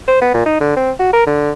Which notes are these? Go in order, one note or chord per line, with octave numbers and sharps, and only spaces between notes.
C5
B3
A#2
D#4
D3
C4
F#4
A#4
D3